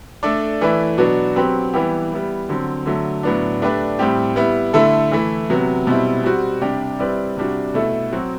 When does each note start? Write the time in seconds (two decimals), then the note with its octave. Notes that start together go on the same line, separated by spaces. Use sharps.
0.23 A3 D4 A4 D5
0.61 E3 A3 E4 B4 D5
0.98 B2 F#3 B3 D4 F#4
1.36 F#3 C4 G4 B4
1.73 E3 G3 B3 E4 G4
2.12 G3 B3 E4
2.49 D3 F#3 C4
2.86 D3 F#3 A3
3.23 A2 F#3 B3 D4
3.62 A3 D4 G4 B4 D5
3.99 A2 G3 C4 G4
4.36 G3 B3 E4
4.73 D3 A3 E4 A4
5.12 E3 A3 E4
5.50 C3 F#3 B3
5.87 B2 G3 C4 E4
6.24 G3 C4 F#4
6.61 C3 G3 D4 G4 D5
6.99 G3 C4 E4 B4 D5
7.37 C3 G3 D4 F#4
7.74 B2 A3 E4 A4
8.12 F#3 C4 F#4